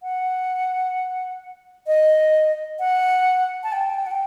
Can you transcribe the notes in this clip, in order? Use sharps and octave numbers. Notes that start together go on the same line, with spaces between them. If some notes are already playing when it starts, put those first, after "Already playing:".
F#5
D#5
F#5
A5
G5
A5
G5
F#5
G5